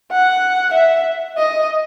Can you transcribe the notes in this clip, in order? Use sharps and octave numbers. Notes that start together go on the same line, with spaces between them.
F#5
E5
D#5